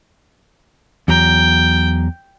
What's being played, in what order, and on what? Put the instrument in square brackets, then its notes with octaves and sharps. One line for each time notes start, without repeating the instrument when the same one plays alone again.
[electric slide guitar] E2 F#3 A#5 [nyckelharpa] G5